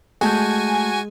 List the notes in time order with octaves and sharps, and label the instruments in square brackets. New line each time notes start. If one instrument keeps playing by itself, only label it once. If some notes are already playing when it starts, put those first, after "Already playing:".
[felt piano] G#3 [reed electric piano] A3 A5 G6 [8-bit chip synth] F#4 [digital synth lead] G#5